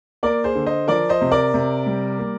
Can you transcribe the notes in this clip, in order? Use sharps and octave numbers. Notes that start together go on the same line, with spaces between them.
A#3 A#4 D5
G#4 C5
D3
C5 D#5
F3 A#4 D5
C5 D#5
C3
A#4 D5
C3
G3
A#3